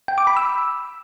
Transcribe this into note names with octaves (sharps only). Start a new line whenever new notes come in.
G5
D6
B5
E6